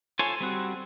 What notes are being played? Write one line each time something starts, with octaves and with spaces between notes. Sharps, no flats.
F4 A4 C5 C#5 G#5
G3 C4 F#4